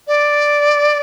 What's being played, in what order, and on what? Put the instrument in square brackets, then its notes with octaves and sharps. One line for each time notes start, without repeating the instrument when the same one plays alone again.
[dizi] D5